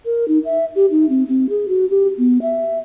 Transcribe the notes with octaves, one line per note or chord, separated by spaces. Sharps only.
A#4
D#4
E5
G4
D#4
C4
C4
G#4
F#4
G4
B3
E5